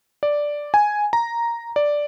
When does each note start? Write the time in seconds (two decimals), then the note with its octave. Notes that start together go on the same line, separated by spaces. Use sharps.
0.23 D5
0.74 G#5
1.13 A#5
1.76 D5